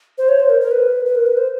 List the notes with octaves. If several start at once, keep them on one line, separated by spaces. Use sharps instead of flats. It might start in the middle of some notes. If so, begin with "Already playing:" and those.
C5
C#5
C5
A#4
A#4
B4
B4
A#4
B4
C5